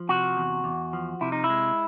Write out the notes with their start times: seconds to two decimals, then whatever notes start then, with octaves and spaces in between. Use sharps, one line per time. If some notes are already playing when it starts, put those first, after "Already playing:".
Already playing: F3
0.09 C3 F#4
0.37 E2
0.64 E2
0.93 F3
1.21 C3 E4
1.32 D#4
1.44 E4
1.50 G#3